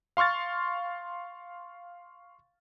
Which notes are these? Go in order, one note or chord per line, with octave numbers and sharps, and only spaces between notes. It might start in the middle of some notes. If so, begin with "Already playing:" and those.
F5 C6 C#6 F6 A6